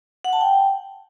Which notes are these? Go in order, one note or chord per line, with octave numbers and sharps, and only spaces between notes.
F#5
A5
G5